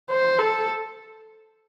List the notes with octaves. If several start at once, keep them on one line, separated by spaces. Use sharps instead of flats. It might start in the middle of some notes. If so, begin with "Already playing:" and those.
C5
A4